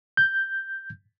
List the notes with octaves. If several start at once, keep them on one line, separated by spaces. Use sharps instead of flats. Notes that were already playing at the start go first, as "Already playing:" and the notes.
G6